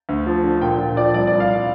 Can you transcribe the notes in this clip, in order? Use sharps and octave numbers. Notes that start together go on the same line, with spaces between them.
D2
F3
D3
A#2 G5
A#2
F3 D5
C2 D5
D5
C2
F5
F5